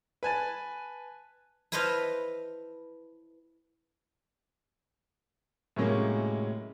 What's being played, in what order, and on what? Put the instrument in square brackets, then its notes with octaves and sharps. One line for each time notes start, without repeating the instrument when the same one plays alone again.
[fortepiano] B4 G#5 A5
[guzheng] E4 A4 B4 C5 D#5 F5
[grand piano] A2 C3 F#3 G#3 A#3 C#4